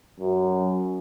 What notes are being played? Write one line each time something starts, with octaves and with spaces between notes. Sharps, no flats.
F#2